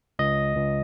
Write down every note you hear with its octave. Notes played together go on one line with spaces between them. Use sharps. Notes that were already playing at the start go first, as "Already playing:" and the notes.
C#2 D#5
C#2